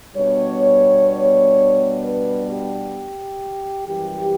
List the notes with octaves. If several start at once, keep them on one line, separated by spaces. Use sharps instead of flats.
B2 G3 B3 D4 C#5
B4
G4
F#2 E3 G3 G4